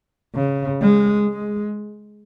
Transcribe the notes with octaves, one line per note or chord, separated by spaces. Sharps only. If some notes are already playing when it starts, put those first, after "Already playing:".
C#3
G#3
G#3